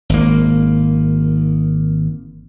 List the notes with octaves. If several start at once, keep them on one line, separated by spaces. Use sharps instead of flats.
G#1 A#3